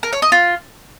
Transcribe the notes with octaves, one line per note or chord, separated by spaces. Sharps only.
A#4
C#5
D#5
F4